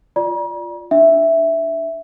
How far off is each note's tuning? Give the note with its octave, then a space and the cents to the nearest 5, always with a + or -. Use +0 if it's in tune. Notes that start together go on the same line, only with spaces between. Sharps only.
F4 +0 D5 +0 A#5 +45
D4 +0 E5 +0